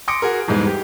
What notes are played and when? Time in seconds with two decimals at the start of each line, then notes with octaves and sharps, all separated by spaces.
0.08 C6 D6 D#6 A#6 C#7 D7
0.22 F#4 G#4 A#4
0.47 E2 G#2 E3 G3 G#3
0.67 G4